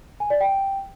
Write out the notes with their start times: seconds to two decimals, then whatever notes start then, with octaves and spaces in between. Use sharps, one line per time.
0.20 G#5
0.30 D5
0.41 G5